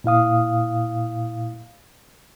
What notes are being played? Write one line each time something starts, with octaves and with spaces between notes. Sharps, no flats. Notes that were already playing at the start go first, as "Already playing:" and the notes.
A#2 E4 F5 D#6